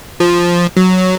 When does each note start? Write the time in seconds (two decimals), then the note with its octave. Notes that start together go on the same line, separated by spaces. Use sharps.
0.20 F3
0.77 F#3